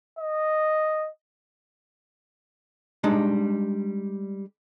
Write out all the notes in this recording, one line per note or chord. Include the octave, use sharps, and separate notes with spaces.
D#5
G3 G#3 D4 D#4